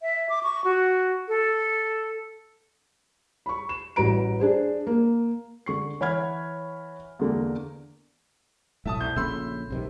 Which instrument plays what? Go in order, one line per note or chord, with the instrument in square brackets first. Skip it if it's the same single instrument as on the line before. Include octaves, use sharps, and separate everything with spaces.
[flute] E5
D6
C#6
F#4
A4
[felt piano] B5 C#6
E7
A1 G3 F#4 B4 A#5 D7
D4 G#4 C5
A#3
D3 C#6 C7
E3 C#5 F#5 B5 F6 G#6
E2 D3 A#3
[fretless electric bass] B1 A2 [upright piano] E5 A5 D#6
[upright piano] C2 G6
[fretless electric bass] A#1 C#3 A3 [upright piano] B5 C6 E6
[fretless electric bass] B1 C3 D#3